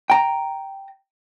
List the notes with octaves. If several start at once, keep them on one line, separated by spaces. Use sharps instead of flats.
G5 A#5